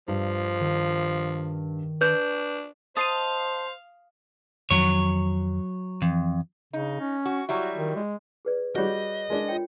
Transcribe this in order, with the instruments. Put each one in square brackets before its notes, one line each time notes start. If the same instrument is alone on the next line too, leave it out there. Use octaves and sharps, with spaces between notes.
[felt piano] G2 [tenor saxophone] F3
[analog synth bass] D#3
[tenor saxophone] D4 [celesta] B4 G6
[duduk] C5 [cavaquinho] D#5 A5 [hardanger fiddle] F5 [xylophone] D#6 C7 D#7
[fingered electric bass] F2 D#3 F3 [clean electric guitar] F#3 C#5
[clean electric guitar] F2 [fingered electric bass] E3
[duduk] C#3 [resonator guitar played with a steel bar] D#4
[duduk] C#4
[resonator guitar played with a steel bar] F#4
[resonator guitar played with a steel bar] F#3 G3 E4 [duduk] F#4
[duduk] D#3
G#3
[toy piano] G#4 B4 D5
[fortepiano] G3 F#4 [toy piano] G#4 C#5 [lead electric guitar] D#5
[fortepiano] G#3 D4 [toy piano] A#4
[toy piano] F4 C#5 G5